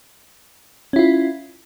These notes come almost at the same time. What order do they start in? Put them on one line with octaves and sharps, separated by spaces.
C#4 E4 F4